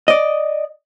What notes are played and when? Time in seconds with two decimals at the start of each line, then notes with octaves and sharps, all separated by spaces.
0.08 D5 D#5